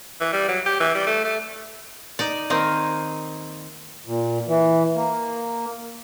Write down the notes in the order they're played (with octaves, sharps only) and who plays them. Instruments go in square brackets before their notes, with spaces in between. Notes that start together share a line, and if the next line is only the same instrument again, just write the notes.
[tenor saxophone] E3
G3
F#3
G4
E3
G3
A3
A3
[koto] D#4 D5
D#3 A#3 C4 D#4
[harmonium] A#2
E3
A#3